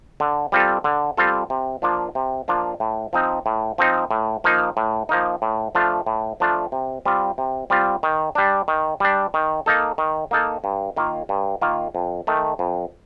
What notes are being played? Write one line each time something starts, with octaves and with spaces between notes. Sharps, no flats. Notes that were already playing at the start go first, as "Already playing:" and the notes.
D3
G3 C4 F4 A4
D3
G3 C4 F4 A4
C3
F3 A#3 D4 F4
C3
F3 A#3 D4 F4
A2
F3 C4 D#4
A2
F3 C4 D#4
A2
F3 A#3 D#4
A2
F3 A#3 D#4
A2
F3 A3 D4 F4
A2
F3 A3 D4 F4
C3
G3 C4 F4
C3
G3 C4 F4
D#3
G3 D4
D#3
G3 D4
D#3
A#3 D#4 A4
D#3
A#3 D#4 A4
G2
D#3 A#3 F4
G2
D#3 A#3 F4
F2
D#3 A3
F2